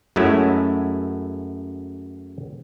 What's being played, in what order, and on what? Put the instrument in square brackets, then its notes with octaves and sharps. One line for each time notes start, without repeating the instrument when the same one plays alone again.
[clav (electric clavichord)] F#2 G#3 A3 C#4 E4